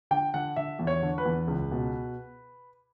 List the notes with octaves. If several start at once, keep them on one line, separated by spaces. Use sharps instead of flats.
D3 G5
D3 F#5
D3 E5
E2
C#5
D3
B4
E2
C#2
B2